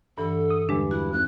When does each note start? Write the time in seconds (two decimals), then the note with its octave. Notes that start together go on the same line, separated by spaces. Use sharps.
0.18 G2 D3 E3 A4
0.50 D#6
0.69 E2 G2 D3 G#3 D4
0.91 E4 F#4
1.12 G#1 F#6